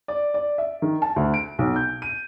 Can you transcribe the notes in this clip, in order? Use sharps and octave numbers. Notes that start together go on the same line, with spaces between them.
D5
D5
E5
D#3
A5
D2
D7
B1
G6
D#7